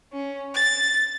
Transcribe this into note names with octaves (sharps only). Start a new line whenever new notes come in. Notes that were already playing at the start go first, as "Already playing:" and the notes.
C#4
A6